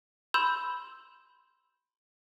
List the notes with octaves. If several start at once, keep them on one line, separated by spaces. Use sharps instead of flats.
B5 C6 E6 G6 E7